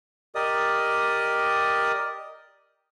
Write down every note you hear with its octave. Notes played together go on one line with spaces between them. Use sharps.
G4 A#4 D5 D#5 D#6